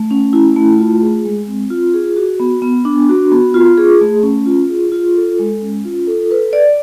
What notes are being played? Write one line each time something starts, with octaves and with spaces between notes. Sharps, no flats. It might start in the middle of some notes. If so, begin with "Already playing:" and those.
Already playing: A3
C#4
E4
A3
F4
G#4
G#3
C4
F4
G#4
F#4
B3
B3
D4
F#4
B3
F4
G#4
A3
C#4
F4
G#4
F4
A4
G#3
C#4
F4
A4
B4
D5